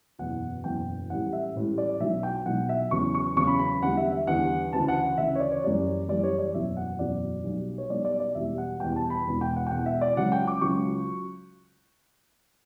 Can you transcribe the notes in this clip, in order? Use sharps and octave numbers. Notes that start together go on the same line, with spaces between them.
F#1 E2 B2 F#5
F#1 E2 B2 G5
A1 A2 G3 F#5
E5
A1 A2 G3
D5
B1 B2 F#3 E5
G5
B1 B2 F#3 F#5
E5
E2 C#3 F#3 C#6
C#6
E2 C#3 F#3 C#6
B5
B5
E2 D3 G3 F#5
E5
E5
E2 D3 G3 F#5
D2 C#3 E3 A5
F#5
F#5
D2 C#3 E3 E5
C#5
D5
C#5
F#1 F#2 E3 G3 D5
F#1 F#2 E3 G3 D5
C#5
D5
F#1 E2 B2 F#3 E5
F#5
F#1 E2 B2 F#3 D5
B1 B2 G3
C#5
B1 B2 G3 D5
D5
D5
E2 B2 G3 E5
F#5
E2 B2 G3 G5
A5
B5
E1 E2 B2
G5
F#5
G5
E1 E2 B2 F#5
E5
D5
C#2 C#3 F#3 F#5
G5
D6
C#2 C#3 F#3 C#6